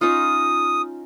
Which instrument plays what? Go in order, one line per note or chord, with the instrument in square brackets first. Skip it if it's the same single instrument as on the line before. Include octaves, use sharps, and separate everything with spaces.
[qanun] C#4 D#4 F4 [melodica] D#6